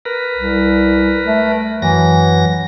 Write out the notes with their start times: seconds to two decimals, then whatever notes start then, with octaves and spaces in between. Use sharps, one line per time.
0.05 A#4 B4
0.35 C2
1.26 A3
1.82 F#2 E3 F#3 A#6